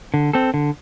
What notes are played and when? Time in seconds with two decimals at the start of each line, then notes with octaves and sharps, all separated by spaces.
0.14 D3
0.33 C4 A4
0.54 D3